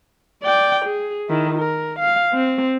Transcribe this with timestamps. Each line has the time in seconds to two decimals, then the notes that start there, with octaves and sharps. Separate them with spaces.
0.43 D5 G5
0.85 G#4
1.29 D#3 E4
1.58 A#4
1.99 F5
2.33 C4